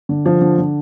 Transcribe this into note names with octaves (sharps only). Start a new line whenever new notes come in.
D3
F3
D3
D3